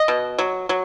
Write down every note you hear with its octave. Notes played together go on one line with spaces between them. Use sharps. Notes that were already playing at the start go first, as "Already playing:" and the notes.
Already playing: D#5
B2
F#3
F#3